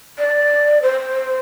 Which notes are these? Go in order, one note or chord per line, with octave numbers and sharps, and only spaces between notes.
D5
C5